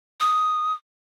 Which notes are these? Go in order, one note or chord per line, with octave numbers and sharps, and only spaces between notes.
D#6